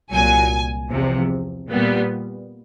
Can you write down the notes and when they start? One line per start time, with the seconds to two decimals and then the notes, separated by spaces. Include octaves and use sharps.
0.12 C2 A#2 F#3 G#5
0.91 E2 C3 F3
1.70 A#2 G3 B3